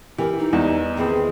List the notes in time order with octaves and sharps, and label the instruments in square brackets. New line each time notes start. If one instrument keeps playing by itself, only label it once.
[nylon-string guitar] E3 [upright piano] G4 [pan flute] A#4
[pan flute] D#4
[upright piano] E2 [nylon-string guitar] G3 D#5
[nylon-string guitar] D#3 E3 C4 [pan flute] G#4